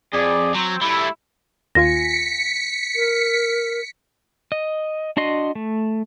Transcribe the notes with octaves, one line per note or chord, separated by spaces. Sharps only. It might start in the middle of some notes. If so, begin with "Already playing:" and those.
F2 G#4 D5
F#3 C4
G3 A3 E4
D#2 F4 G#5 A#6 B6 C#7
A#4
D#5
D4 F#4 D#5 C6
A3